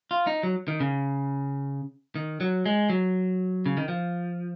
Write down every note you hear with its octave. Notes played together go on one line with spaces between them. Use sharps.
F4
D#4
F#3
D#3
C#3
D#3
F#3
G#3
F#3
C#3
D#3
F3